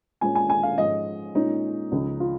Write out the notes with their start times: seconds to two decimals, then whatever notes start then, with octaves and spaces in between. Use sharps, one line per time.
0.21 A#2 G#3 C#4 G#5
0.35 G#5
0.50 G#5
0.63 F5
0.78 G#2 F3 C#4 D#5
1.35 A#2 G#3 C#4 D#4
1.92 C#2 C#3 F3
2.20 F4